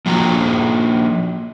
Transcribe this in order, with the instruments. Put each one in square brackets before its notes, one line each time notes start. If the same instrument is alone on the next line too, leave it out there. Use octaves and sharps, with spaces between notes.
[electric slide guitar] F3 A#3 F#4 A#5